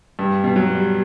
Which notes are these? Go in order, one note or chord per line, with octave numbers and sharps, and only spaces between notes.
G2
B2
F#3
G3